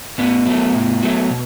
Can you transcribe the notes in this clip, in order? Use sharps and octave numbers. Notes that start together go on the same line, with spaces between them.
A2 B3
F#3 A3
A2
F#3 A3
B2